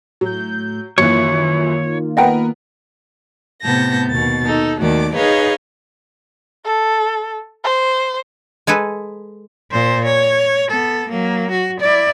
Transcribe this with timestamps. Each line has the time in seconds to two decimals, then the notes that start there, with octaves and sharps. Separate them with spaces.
0.21 A2 F#3 G6
0.98 F#2 D#3 E3 A#3 F4 C#5
2.17 B3 A#4 B4 D#5 F#5 G5
3.63 A2 C3 B3 A5 G6 A#6
4.10 D#2 B2 A6
4.46 D#4 A4
4.79 D#2 D#3 A3 F#4 D5 D6
5.14 D#4 G#4 B4 C#5 D#5 F5
6.65 A4
7.64 C5
8.67 G#3 G#4 A4 B4
9.71 A#2 C5
10.05 C#5
10.70 B3 A4
11.09 F#3 A#3
11.51 F#4
11.80 E4 D5